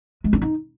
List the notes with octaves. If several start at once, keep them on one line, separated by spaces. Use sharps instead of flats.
G#3
D4
D#4